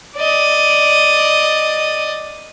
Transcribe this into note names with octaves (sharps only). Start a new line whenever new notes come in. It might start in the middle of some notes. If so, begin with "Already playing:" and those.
D5 D#5